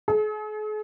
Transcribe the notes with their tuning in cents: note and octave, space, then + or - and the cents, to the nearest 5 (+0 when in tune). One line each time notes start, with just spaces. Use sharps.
G#4 +45